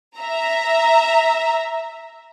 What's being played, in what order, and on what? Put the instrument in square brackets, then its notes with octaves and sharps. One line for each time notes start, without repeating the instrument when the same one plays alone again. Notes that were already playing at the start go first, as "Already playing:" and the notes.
[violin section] E5 A#5